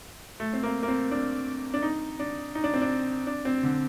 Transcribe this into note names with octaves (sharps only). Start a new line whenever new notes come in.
A3
C4
A#3
A#3
C4
D4
D4
D#4
D4
D#4
D4
C4
D4
D4
C4
D3